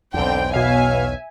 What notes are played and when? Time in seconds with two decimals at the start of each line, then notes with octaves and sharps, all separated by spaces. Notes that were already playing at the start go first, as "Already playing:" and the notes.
0.14 B1 E2 D3 C4 G5
0.54 B2 C#5 E5 F5 G#5